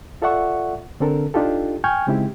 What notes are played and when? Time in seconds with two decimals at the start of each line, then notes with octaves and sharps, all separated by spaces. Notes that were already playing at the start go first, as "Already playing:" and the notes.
0.22 F4 A4 D5 E5 F#5 C#6
1.00 D3 C4 D4 A4 A#4
1.34 D4 D#4 F4 G4 A4
1.84 G5 G#5 C#6 F6 G6 G#6
2.07 C#3 G#3 C4 D#4 E4 G4